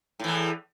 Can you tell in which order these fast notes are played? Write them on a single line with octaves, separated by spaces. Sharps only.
A2 E3 E2